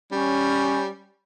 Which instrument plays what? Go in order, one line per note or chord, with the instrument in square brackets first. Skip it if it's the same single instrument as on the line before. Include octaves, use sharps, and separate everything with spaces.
[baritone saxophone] G3 [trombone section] C#4